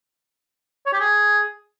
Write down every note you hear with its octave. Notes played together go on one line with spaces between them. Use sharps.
C#5
G4
G#4